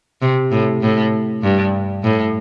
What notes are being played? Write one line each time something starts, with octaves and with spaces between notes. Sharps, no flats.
C3
A2
A2
G2
A2